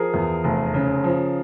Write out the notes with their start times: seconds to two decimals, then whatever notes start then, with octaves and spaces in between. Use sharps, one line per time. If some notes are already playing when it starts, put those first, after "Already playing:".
Already playing: F3 G#4 A#4
0.14 E2
0.44 F1
0.74 C#3
1.04 F3